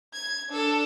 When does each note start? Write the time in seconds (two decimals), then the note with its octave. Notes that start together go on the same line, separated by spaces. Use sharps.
0.14 G#6
0.50 D4 A4